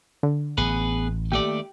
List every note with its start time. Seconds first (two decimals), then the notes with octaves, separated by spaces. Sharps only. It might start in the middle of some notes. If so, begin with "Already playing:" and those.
0.23 D3
0.58 A1 B3 G#4 B4
1.32 D#2 A3 G4 D5